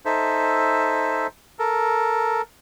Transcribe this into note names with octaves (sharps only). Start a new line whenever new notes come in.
D#4 A4 C5 E5
A4 A#4